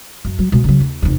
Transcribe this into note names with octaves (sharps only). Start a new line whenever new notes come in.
F#2
F#3
B2 G#3
C#3 F#3
D#2
F1 E2